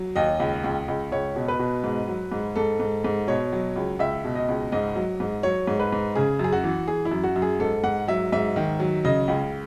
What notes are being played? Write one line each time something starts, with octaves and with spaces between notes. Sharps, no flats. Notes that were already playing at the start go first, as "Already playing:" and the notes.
Already playing: F#3
D#2 D#5
C#2
C#2
C#2
C#2 C#5
B2
B4
B2
G#2
F#3
G#2
G#2 A4
G#2
G#2
B2 C#5
F#3
C#2
C#2 E5
B2
D#5
C#2
G#2 D#5
F#3
G#2
F#3 C#5
G#2
B4
G#2
C#3 G#4
F#2 G#4
F#4
E3
E3 G#4
E4
F#2
F#4
F#2
G#4
G#2 A4
G#2 F#5
F#3 E5
G#2 E5
D#3
F#3
C#3 D#5
C#2